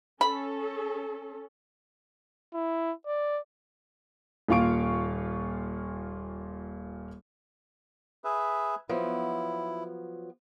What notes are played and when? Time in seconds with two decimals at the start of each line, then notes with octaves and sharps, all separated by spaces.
0.21 C#4 A4 B5
2.54 E4
3.07 D5
4.49 D#1 A#2 F4 F5 C#6 D7
8.24 G#4 B4 E5
8.89 F3 F#3 B3 E4